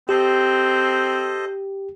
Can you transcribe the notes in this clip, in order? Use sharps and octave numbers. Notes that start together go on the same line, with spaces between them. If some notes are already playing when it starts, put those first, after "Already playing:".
C4 G4 A4 C5 D#5